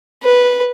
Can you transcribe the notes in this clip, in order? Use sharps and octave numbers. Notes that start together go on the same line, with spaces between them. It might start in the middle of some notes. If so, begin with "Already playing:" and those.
B4